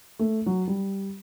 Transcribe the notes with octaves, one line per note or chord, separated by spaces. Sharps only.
A3
F#3
G3